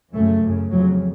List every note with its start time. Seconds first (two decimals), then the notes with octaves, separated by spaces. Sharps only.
0.13 F#2 C#3 A3
0.42 F#2 C#3
0.71 F2 C#3 F#3